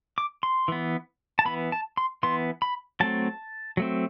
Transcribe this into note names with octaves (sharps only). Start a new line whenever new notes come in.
D6
C6
E3 B3
A5
E3 B3 B5
A5
C6
E3 B3 C6
B5
F#3 A3 C4 A5
F#3 A3 C4